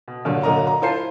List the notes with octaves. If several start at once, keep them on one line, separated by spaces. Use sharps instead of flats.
B2
G2 A#2 D3 F#3
A#2 D3 F#3 A#4 D#5 A#5
A#5
E4 F4 C5 A5 C7